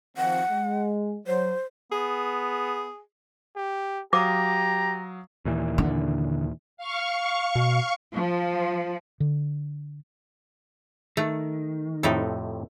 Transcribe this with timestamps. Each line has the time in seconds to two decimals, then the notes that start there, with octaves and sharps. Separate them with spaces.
0.17 D#3 F3 C4 F#5
0.51 G#3
1.27 F#3 C5
1.92 B3 G#4
3.56 G4
4.13 F#3 G4 F5 A#5 D6 D#6
5.45 D#2 A#2 E3
5.78 D3
6.77 F5 C#6
7.55 B2
8.15 F3
9.20 D3
11.17 D#3 A3
12.03 F2 A2 C3 D#4 E4 A4